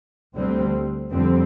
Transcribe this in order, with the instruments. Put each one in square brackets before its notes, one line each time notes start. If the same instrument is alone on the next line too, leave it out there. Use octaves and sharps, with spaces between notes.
[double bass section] D2 D3 G3 C4
F2 D3 G3 C4